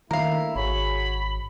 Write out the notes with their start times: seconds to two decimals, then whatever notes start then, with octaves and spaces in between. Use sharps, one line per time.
0.11 D#3 A3 A#3 D4 E4 A#4 F5
0.55 G#1 F#4 G#4 C#5 B5